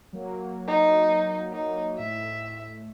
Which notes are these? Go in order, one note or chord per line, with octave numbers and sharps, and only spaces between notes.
F#3 A#3
D#4
D#4
A2 E5